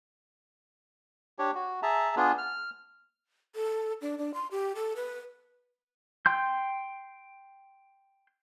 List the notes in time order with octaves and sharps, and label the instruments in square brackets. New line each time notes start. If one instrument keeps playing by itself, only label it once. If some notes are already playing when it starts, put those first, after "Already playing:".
[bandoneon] D4 G4 C#5
F#4
G#4 E5 A5 A#5
B3 D4 F4 G#4
F6
[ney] A4
D4
D4
C6
G4
A4
B4
[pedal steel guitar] G5 C6 G6